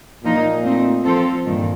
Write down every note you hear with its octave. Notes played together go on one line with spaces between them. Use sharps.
A#2 F3 A#3 D#4
A3 C4 D#4
F3 C4 F4 A4 C5
G2 A#2 D#3